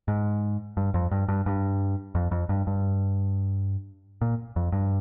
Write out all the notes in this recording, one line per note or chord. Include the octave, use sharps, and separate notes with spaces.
G#2
G2
F2
G2
G2
G2
F2
F2
G2
G2
A#2
F2
G2